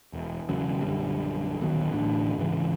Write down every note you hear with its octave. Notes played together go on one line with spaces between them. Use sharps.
E1
E1 C#3 F#3
A#1 F#2 D3 G3
D#1 B1 B2 D#3
A1 D2 A2 D4
G#2 C#3 E3